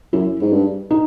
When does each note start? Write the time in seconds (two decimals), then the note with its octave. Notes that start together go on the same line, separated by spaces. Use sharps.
0.13 F#2 E4
0.41 G#2
0.52 G2
0.91 D#4